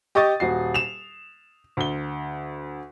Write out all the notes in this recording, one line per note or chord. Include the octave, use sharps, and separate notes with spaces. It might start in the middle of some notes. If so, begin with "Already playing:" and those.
G4 D#5 C#6 D#6 A6
D#1 F#4 C7
E7 F7
D2 G7